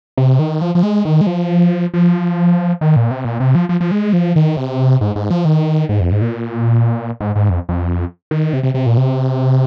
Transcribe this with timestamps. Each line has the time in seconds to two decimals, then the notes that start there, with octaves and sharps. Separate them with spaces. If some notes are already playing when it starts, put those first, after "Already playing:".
0.18 C3
0.39 D#3
0.61 F3
0.75 F3
0.83 G#3
1.05 D#3
1.21 G#3
1.27 F3
1.94 F3
2.81 D#3
2.96 A#2
3.11 C3
3.25 A#2
3.40 C3
3.55 F3
3.69 F3
3.81 F3
3.91 G#3
4.13 F3
4.36 D#3
4.57 C3
5.01 G#2
5.16 G#2
5.30 F3
5.45 D#3
5.89 G#2
6.00 F2
6.12 G#2
6.21 A#2
7.21 G#2
7.36 G#2
7.50 F2
7.69 F2
8.31 D#3
8.53 C3
8.63 C3
8.74 C3
8.86 A#2
8.97 C3